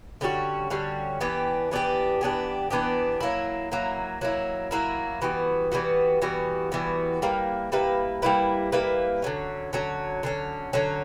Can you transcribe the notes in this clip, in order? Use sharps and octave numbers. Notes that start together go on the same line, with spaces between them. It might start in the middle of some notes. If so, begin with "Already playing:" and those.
D3 G3 C#4 F#4
D3 G3 C#4 F#4
E3 B3 D4 G4
E3 B3 D4 G4
E3 B3 D4 G4
E3 B3 D4 G4
F#3 A#3 E4
F#3 A#3 E4
F#3 A#3 E4
F#3 A#3 E4
E3 G3 B3 F#4
E3 G3 B3 F#4
E3 G3 B3 F#4
E3 G3 B3 F#4
G3 A#3 E4 B4
G3 A#3 E4 B4
G3 A#3 E4 B4
G3 A#3 E4 B4
D3 F#3 C#4
D3 F#3 C#4
D3 F#3 C#4
D3 F#3 C#4